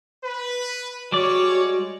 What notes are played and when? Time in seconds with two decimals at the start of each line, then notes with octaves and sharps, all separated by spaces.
0.23 B4
1.12 G3 G#3 F#4 C#5 D5